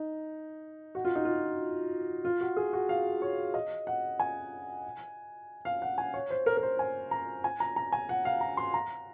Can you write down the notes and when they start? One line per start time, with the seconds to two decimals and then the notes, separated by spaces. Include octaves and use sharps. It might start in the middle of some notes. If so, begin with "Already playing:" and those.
Already playing: D#4
0.95 F#4
1.05 F4
1.16 D#4
1.25 F4
2.25 F4
2.41 F#4
2.57 G#4
2.73 F#4
2.89 F5
3.22 C#5
3.54 D#5
3.87 F#5
4.20 G#5
5.65 F5
5.82 F#5
5.98 G#5
6.14 C#5
6.30 C5
6.46 A#4
6.57 A#4
6.63 C5
6.79 G#5
7.11 A#5
7.44 G#5
7.60 A#5
7.76 A#5
7.92 G#5
8.09 F#5
8.25 F5
8.41 A#5
8.57 C6
8.74 A#5